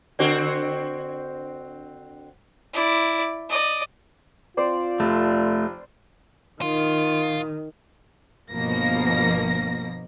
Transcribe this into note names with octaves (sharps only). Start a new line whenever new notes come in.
D3 C4 F#4
E4 D5
D5 D#5
C4 F4 C5 D5
F1 A3
D#3 F4
G1 B2 F3 A#3 A#6